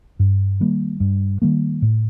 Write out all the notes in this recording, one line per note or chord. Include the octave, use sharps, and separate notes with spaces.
G2
D#3 G3 A#3
G2
D#3 G3 A#3
A2